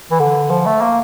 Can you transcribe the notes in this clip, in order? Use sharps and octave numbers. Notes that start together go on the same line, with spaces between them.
E3
D3
F3
A3
A#3